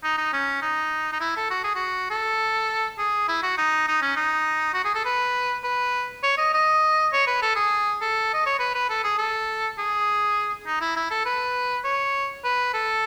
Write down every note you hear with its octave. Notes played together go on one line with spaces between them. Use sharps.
D#4
D#4
C#4
D#4
D#4
E4
A4
F#4
G#4
F#4
A4
G#4
E4
F#4
D#4
D#4
C#4
D#4
F#4
G#4
A4
B4
B4
C#5
D#5
D#5
C#5
B4
A4
G#4
A4
D#5
C#5
B4
B4
A4
G#4
A4
G#4
D#4
E4
E4
A4
B4
C#5
B4
A4